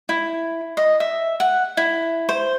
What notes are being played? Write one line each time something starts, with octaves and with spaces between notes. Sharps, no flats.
E4
D#5
E5
F#5
E4
C5